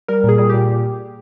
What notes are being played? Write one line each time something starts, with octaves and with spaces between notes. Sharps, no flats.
G3 A#4
A#2 G#4
G3 G#4
A#2 G4